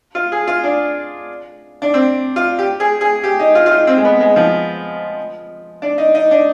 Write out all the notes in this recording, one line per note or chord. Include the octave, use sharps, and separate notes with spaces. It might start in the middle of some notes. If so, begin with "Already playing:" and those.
F4
G#4
F4
D4
D4
C4
F4
G4
G#4
G#4
G4
D#4
F4
F4
D#4
C4
G#3
B3
G#3
F3
D4
D#4
D#4
D4